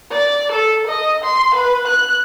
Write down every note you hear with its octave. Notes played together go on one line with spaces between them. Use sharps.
D5
A4
D#5
C6
B4
F#6